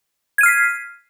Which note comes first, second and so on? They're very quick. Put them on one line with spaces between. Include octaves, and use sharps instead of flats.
G#6 D#7 F6 C7 B6